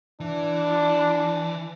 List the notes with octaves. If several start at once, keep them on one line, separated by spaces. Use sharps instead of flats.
E3 D4